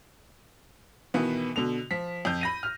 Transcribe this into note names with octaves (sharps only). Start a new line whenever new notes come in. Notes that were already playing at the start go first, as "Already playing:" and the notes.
B2 D#3 E3 B3
B2 D3 F7
F3 B6
F2 G6
B5 A#6 D#7
F6